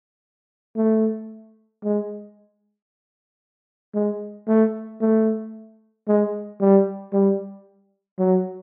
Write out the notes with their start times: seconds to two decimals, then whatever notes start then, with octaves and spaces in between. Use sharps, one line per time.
0.77 A3
1.84 G#3
3.95 G#3
4.48 A3
5.01 A3
6.08 G#3
6.61 G3
7.13 G3
8.19 F#3